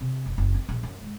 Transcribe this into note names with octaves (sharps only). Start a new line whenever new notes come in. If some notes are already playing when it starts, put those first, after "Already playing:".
C3
F1
F#1
C4
A#1
F#2
G#2